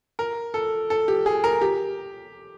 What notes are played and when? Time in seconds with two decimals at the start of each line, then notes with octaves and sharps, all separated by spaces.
0.19 A#4
0.54 A4
0.90 A4
1.08 G4
1.26 G#4
1.44 A#4
1.61 G4